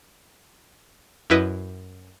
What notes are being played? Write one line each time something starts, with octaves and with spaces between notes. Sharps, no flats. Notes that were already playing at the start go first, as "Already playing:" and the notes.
F#2 E4 B4 D#5